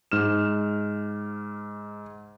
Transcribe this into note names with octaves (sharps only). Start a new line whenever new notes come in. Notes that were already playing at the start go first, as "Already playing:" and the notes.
G#2 F6 E7